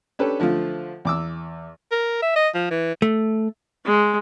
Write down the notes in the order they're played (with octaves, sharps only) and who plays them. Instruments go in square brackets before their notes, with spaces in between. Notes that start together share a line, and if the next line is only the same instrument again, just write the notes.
[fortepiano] C#4 D4 G4 A4 B4 C#5
D3 F3 A3 F4
E2 D6 E6
[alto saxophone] A#4
E5
D#5
F3
E3
[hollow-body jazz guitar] A3
[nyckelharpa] G#3